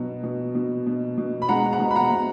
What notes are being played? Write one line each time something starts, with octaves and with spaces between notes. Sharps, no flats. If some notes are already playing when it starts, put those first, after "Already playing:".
Already playing: B2 F#3
B2
B2
B2
B2
B5
G#3 F#5 A#5
F#5 A#5
B2
B5
F#5 A#5
B2